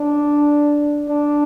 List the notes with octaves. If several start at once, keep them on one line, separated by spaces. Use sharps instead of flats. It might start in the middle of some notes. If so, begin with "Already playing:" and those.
Already playing: D4
D4